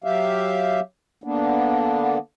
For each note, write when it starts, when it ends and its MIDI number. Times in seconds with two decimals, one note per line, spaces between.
0.04 0.80 54
0.04 0.80 67
0.04 0.80 76
0.04 0.80 77
1.24 2.18 50
1.24 2.18 58
1.24 2.18 59
1.24 2.18 62